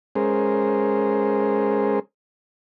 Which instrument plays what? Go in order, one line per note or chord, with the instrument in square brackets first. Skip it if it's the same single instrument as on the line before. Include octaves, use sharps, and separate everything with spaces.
[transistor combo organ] G#3 C#4 G#4 A#4 C5